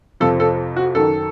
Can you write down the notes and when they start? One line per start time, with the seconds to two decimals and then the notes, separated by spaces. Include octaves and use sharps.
0.20 F2 C3 F3 A4
0.40 A4
0.76 F#4
0.95 F#2 D#3 A4